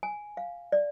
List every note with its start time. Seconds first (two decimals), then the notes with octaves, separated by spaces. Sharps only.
0.03 G#5
0.37 F5
0.72 D5